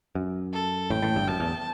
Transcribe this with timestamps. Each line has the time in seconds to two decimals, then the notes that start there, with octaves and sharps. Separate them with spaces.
0.15 F#2
0.53 A4
0.90 A1 A2 G5
1.02 A1 A2
1.15 G1 G2
1.27 F#2 A5
1.40 E2